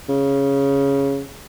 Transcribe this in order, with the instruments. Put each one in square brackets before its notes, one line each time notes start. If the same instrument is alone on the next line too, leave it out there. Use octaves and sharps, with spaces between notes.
[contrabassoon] C#3